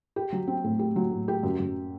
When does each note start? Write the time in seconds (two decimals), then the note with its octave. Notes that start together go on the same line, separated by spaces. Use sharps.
0.16 G4
0.33 F#3
0.48 C4
0.64 A2
0.79 G4
0.96 F#3
1.11 A2
1.28 G4
1.43 F#2
1.60 F#2